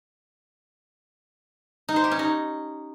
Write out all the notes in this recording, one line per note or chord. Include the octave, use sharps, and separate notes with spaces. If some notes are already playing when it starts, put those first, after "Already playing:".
D#4
C5
G4
C#4
D#4